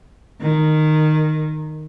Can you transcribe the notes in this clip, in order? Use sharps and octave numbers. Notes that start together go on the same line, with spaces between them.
D#3